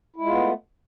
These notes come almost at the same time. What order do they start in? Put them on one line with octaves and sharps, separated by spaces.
E4 G#3 F4 B3 A3